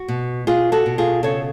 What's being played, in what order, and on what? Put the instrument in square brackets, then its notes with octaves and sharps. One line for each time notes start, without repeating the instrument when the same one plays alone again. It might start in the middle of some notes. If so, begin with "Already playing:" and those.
Already playing: [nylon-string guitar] F#4
B2
B2 F4 G#4
F#4 A4
B2
F4 G#4
C#3 A4 C#5